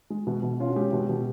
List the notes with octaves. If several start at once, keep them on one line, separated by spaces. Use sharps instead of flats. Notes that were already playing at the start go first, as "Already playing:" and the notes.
G#3
B2
B2
C#4 F4
F#4
G#3 G4
B2
B2